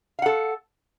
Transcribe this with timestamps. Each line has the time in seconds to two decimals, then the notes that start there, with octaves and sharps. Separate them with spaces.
0.19 F5
0.22 F#5
0.26 A4